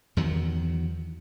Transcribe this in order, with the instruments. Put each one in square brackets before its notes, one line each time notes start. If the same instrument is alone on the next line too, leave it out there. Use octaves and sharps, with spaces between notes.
[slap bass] E2 D#3 F#3